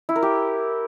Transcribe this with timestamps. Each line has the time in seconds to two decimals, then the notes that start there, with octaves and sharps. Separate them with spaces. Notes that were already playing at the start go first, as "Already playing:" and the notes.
0.09 E4
0.16 A#4
0.23 G4